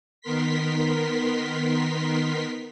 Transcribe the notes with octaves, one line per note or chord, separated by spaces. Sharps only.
D#3 B3 A#4 C6 B6